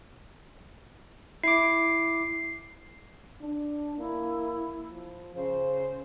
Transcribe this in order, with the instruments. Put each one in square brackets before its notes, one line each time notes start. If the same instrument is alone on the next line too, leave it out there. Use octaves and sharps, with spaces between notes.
[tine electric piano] E4 D6 [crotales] C7
[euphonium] D4
[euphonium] A#3 [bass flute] E4
[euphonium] F3
[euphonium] C#3 [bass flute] C5